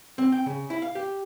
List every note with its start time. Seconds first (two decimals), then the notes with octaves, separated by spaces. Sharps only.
0.18 C4
0.32 G5
0.46 C#3
0.70 E4
0.82 F5
0.95 G4